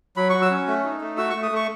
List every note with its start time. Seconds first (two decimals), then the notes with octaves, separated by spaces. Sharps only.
0.17 F#3 B5
0.30 F#4 C#6
0.42 E6
0.50 C#4
0.67 A3
0.84 D#4
1.01 A3
1.17 F#4 E6
1.30 A3 C#6
1.43 D#6
1.51 A3 C#6